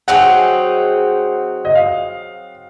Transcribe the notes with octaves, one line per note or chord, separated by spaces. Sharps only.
F#3 C4 D#4 G#4 F#5
D#5
F5